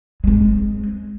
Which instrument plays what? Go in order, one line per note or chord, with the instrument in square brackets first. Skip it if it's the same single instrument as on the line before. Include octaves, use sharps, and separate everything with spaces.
[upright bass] G#3 C4